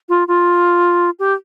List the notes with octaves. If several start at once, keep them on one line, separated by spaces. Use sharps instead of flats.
F4
F4
G4